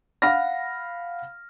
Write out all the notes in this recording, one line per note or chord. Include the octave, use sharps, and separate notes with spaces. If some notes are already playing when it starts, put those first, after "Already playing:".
F5 F#5 B5 F6 A#6